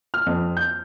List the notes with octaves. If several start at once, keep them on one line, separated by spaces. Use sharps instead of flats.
F6
F2
G6